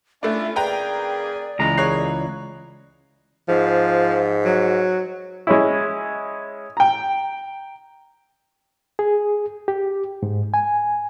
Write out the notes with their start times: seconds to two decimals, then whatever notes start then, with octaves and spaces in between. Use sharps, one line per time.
0.23 A3 C#4 D4 E4 F4 E5
0.56 C#3 A#3 G#4 B4 D5 G5 A#5
1.59 C#2 E3 G#3 A#5
1.78 D#2 A#3 G#4 C#5 F#6 C7
3.49 G#2 F3
4.45 F#3
5.47 G#3 C#4 E4
6.77 G5 A#5
8.99 G#4
9.68 G4
10.23 G#2
10.54 G#5